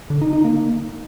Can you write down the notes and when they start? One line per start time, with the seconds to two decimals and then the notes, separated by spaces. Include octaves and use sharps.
0.10 D3
0.21 D#4
0.33 D#4
0.44 A#3